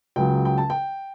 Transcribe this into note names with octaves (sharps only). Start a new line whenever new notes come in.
C#2 C#3 F#3 G5
G5
A5
G5